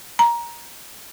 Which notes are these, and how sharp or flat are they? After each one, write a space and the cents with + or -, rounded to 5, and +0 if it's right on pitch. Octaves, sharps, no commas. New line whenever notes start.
A#5 +15